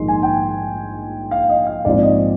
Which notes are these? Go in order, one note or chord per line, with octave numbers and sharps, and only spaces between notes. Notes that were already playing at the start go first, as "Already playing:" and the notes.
Already playing: A#1 G#2 D#3 G#3 D#4 C6
G#5
G5
F5
D#5
F5
A#1 G#2 F3 C4 D5
D#5